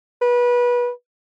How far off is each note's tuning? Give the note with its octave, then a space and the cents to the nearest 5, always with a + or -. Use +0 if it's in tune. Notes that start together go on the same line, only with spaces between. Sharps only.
B4 -25